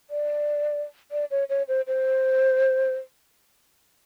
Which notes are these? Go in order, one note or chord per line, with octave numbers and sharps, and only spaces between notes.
D5
D5
C#5
C#5
C5
C5